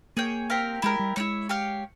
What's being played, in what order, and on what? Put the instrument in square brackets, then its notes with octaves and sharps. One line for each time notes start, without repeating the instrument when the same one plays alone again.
[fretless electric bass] A#3 [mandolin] G#4 C#5 G5
[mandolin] C4 G4 A#4 F5
[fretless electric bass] G#3 [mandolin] E4 G4 A#4
[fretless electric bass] G3
[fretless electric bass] G#3 [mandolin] E4 G4 C#5
[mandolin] G4 C#5 F5